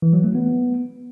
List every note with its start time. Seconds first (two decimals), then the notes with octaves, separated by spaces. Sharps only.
0.02 E3
0.13 F#3
0.24 A3
0.35 B3